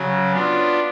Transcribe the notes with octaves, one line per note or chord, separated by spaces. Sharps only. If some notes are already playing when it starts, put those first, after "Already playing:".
Already playing: C#3 F#3 C#4
B3 D4 F4